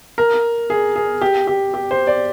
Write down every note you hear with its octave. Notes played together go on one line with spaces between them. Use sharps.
A#4
G#4
G#4
G4
G4
G4
C5
D5